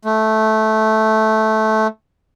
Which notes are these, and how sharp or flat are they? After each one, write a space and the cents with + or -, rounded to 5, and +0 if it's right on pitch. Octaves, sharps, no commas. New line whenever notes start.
A3 -10